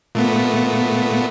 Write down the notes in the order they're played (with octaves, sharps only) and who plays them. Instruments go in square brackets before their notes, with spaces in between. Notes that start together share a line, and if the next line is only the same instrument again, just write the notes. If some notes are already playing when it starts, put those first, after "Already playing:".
[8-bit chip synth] A#2 A3 B3